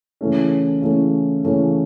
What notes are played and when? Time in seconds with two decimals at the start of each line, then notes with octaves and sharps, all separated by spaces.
0.21 C#3 E3 A3 C#4
0.82 C#3 E3 A3 C#4
1.44 C#3 E3 A3 C#4